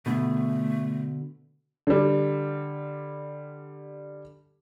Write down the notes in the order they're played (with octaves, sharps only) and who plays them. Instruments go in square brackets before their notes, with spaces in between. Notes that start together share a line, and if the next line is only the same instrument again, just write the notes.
[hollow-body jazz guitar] B2 D3 [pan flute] A3
[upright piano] D3 G3